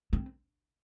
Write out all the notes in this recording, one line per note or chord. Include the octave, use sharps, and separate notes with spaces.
C4